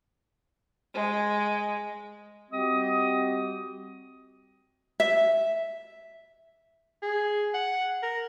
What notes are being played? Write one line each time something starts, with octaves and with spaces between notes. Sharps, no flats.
G#3
G3 C4 F#4 G4 D#5 D#6
E5
G#4
F#5
A#4